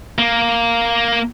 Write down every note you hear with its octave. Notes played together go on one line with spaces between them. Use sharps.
A#3